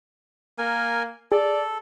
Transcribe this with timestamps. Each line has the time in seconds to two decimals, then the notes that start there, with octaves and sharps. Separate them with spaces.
0.58 A#3 A#4 G#5
1.32 G#4 A4 D5